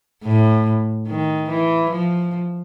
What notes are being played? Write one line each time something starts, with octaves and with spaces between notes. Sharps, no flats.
A2
D#3
E3
F3